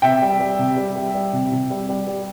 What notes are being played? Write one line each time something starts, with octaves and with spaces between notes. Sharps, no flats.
C3 E5 G5
G3
G3
C3
G3
G3
G3
C3
C3
G3
G3
G3